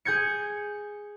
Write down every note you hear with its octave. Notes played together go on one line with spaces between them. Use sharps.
G#4 G6 G#6 C#7